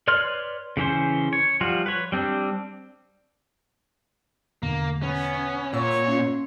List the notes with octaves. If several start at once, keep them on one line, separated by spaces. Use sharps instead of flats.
B4 C#5 D5 C6 F6
C#3 E3 C#4 C5
C#5
F3 G3 F4 F#4
B4 C#5
G3 C4 D4
E2 B2 D3 A#3
B3 C#4
E5
A#2 C#5 F#5 E6
C#4 E5 C6